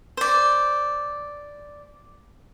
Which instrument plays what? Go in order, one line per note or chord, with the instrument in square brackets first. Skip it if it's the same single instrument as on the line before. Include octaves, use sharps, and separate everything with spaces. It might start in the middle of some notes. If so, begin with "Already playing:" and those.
[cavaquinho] C5 D5